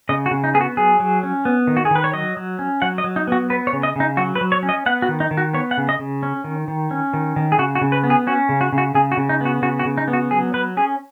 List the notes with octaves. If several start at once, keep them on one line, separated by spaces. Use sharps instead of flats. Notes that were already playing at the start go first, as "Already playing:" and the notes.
C#3 D#5
F#4
C#3
D#4
B3 G#4
F#4
F#3 G#4
F#3
C#4
B3
D#3
F#4
G#4
D#3 B4
C#5
F#3 D#5
F#3
C#4
F#3 F#5
D#5
F#3
D#4
B3 F#4
B3 B4
C#5
C#3
D#5
C#3 D#4
F#3 F#4
B4
F#3
C#5
C#4
D#5
B3 F#5
F#4
D#3
D#4
D#3
F#4
B3 C#5
F#5
C#3
D#5
C#3
C#4
D#3
D#3
C#4
D#3
D#3
G#4
C#3 F#4
F#4
C#3
B4
B3
G#4
C#4 F#4
C#3
F#4
C#3
F#4
C#3 G#4
F#4
C#3
D#4
B3 F#4
C#3 F#4
F#4
C#3
D#4
B3
F#4
F#3 G#4
F#3 B4
C#4 G#4